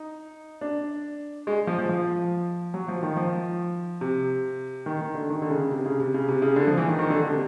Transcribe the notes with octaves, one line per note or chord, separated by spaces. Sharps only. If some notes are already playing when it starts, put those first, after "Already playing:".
Already playing: D#4
D4
G#3
F3
F3
F3
F#3
F3
D#3
F3
C3
D#3
D#3
D3
D#3
D3
C#3
C3
C#3
C3
C#3
C3
C#3
D3
F3
E3
D#3
D#3
D3
D3
C3